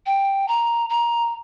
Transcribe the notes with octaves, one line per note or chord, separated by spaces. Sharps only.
G5
A#5
A#5